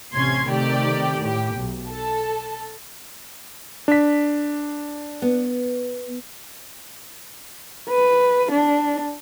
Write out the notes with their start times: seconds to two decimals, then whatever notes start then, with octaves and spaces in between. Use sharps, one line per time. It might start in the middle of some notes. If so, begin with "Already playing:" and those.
0.14 A1 C3 C#4 C6 G#6
0.48 C3 D#3 A3 G4 D5
1.22 A2 G4
1.57 B1
1.89 A4 A5
3.88 D4 B6
5.22 B3
7.88 B4
8.51 D4